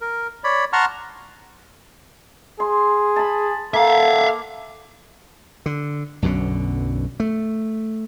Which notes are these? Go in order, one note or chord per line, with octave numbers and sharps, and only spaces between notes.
A#4
C#5 D5 B5
F#5 A5 A#5 C6 C#6 F6
G#4 C6
A5 B5
A#3 A4 E5 F5
D3
B1 F#2 B2 D3
A3